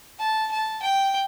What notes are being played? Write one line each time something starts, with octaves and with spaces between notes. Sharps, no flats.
A5
A5
G5